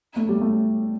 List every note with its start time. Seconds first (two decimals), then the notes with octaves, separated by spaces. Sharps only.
0.16 A3
0.29 G3
0.41 A3